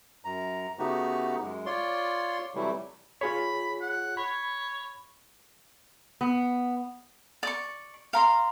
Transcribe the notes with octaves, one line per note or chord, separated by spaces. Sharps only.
F#2 A#5
C#3 A3 B3 D#4 F#4 G4
F#2 G#3
F4 C#5 D5 C6
C3 E3 F#3 G3 A3 E4
F4 G#4 C#5 B5
F#5
C#5 B5
B3
D5 C#6
F5 A#5 C6